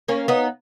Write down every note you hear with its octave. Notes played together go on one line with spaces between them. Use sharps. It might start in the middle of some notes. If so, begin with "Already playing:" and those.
A#3 C#4
B3 D#4